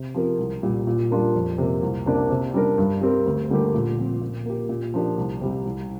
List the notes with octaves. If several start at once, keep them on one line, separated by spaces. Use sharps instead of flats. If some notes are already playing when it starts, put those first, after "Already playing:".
Already playing: C3
F3 C4 G4 A#4
C2
A#2 G3
A#2
G3 D4 F4 A#4
F2
C3 A#3
C2
C3 A#3 D4
C3
G3 D4 A#4
G2
G3 C4 G4 A#4
D2
D3 G3 A#3 G4
A#2
F3 C4
A#2
A#3 G4
A#2
F3 A#3 D4 G4
C2
C3 G3
C2